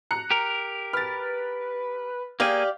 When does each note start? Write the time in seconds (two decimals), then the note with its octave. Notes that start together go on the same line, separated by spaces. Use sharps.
0.11 A#5 F#6 C#7
0.31 G4 A#4
0.93 B4 F6 A6
2.40 A#3 G4 G#4 D5 F5